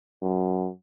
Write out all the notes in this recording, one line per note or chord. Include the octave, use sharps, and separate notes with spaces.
F#2